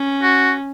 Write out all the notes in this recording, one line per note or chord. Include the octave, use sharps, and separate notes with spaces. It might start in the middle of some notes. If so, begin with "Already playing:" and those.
Already playing: C#4
F#4